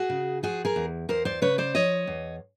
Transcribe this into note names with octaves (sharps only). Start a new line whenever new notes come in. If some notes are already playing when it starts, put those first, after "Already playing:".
Already playing: F#4 G#4
C#3
F3 F#4 G#4
G#4 A#4
E2
E2 A#4 C5
C5 D5
C#3 B4 C#5
C5 D5
F3 C#5 D#5
E2